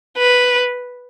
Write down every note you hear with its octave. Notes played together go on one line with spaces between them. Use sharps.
B4